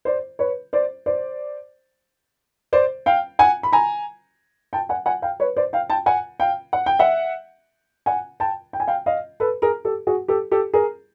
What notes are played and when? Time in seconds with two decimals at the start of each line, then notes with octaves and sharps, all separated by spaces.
0.05 C5 D5
0.39 B4 C#5
0.73 C5 D5
1.06 C5 D5
2.73 C5 D5
3.06 F5 G5
3.39 F#5 G#5
3.63 B5
3.73 G#5 A#5
4.73 G5 A5
4.89 F#5 G#5
5.06 F#5 G#5
5.22 F5 G5
5.40 B4 C#5
5.56 C5 D5
5.73 F5 G5
5.90 G5 A5
6.06 F#5 G#5
6.40 F5 G5
6.73 F#5
6.86 G5
6.99 E5 F#5
8.06 F#5 G#5
8.40 G5 A5
8.73 G5
8.80 G#5
8.87 F5 G5
9.06 D#5 F5
9.40 A4 B4
9.62 G#4 A#4
9.85 G4 A4
10.07 F#4 G#4
10.28 G4 A4
10.51 G4 A4
10.73 G#4 A#4